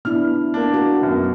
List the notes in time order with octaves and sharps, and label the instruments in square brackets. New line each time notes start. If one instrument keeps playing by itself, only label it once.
[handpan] B3 D4 E4 [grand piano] F6
[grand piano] A#3 D4
[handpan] F#4 A#4
[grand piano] F#2 B2